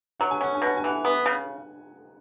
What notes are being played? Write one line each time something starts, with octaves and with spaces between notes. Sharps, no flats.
F#3 F#5
G#5
C#4 F#5
G#5
B2 F#5
G#5
E3 F#5
B3
C#3